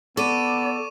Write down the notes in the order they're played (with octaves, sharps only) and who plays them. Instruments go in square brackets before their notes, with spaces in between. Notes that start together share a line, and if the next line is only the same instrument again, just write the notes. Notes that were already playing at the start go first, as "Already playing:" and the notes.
[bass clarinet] B3 [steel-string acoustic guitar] A4 [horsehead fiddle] D5 [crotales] C#6 D6 D#7